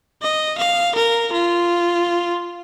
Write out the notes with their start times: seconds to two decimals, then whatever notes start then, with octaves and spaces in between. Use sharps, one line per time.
0.22 D#5
0.58 F5
0.96 A#4
1.33 F4